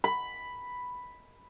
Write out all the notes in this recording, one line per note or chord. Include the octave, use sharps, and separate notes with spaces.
B5